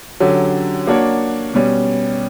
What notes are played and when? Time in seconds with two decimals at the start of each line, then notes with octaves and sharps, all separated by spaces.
0.20 D3 F#3 C#4 G4
0.87 A#3 D4 F#4 C#5
1.54 B2 G3 C#4